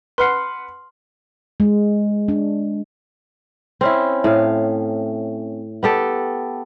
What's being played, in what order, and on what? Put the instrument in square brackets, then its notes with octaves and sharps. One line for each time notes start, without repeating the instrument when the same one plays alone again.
[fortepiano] B4 F#5 [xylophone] C6 F6 C7
[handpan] G#3
D4
[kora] C4 C#4 E4
A2 F5
B3 G4 A4